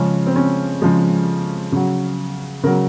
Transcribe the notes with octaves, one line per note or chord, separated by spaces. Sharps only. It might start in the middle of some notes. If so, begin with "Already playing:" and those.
Already playing: C#3 F3 G#3 C#4
C4
C#4
C#3 F3 G#3
C#3 F#3
C#3 F#3 A#4